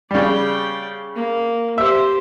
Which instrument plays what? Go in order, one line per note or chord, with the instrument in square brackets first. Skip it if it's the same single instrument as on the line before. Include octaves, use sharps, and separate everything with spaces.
[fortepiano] C#3 G3 [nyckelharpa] D5 G5
[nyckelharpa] A#3
[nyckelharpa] G4 C5 [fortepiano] E5